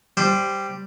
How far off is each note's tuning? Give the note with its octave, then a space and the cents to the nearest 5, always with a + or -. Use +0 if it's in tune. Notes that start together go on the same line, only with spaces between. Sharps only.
G3 +0 C5 +0 C6 -45